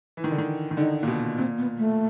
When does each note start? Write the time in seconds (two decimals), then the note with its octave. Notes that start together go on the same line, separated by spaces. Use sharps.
0.17 E3
0.24 D#3
0.31 D3
0.38 D#3
0.71 D#3
0.77 D3 D#4
1.03 A#2
1.07 B2
1.37 A#2 C4
1.58 B3
1.78 A3